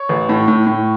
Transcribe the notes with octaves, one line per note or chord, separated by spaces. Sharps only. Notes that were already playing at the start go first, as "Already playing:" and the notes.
Already playing: C#5
A1
A2
A2
A2